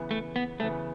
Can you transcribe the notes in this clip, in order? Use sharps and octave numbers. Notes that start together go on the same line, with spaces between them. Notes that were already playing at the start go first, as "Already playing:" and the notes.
Already playing: C#3 E3 B3
A3
B3
C#3 E3 A3 B3